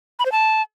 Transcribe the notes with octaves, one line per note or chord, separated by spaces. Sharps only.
B5
C5
A5